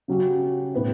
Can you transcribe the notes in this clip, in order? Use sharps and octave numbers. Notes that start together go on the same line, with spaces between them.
C#3 F#3 C#4 G4
A2 G3 B3 E4 G4